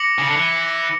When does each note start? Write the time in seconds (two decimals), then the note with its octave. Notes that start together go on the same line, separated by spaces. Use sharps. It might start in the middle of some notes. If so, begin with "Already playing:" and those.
Already playing: D6 A#6 C#7 F#7
0.19 C#3
0.27 D3
0.36 E3